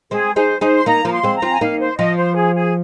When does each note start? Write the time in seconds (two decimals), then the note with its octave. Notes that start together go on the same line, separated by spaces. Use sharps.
0.11 G#3 C4 G#4
0.36 D#4 G#4 C5
0.61 D#4 G#4 C5
0.79 C6
0.86 A#3 D#4 A#5
1.05 F3 A#3 A#5
1.12 C6
1.23 G#3 C4
1.36 A#5
1.42 C4 F4
1.51 G#5
1.61 A#3 D#4 F5
1.80 C5
1.98 F3 D#5
2.17 C5
2.37 G#4
2.56 G#4